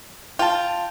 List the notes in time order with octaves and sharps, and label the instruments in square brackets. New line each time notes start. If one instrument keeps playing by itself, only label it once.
[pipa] F4 [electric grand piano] G5 A5